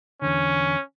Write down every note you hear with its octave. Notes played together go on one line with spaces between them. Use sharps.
E2 D3 C#4